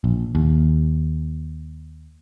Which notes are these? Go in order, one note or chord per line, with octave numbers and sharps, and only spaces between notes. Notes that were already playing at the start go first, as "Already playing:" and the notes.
A#1
D#2